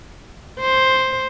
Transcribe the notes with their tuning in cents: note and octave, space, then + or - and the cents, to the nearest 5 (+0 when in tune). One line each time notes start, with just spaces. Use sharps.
C5 +5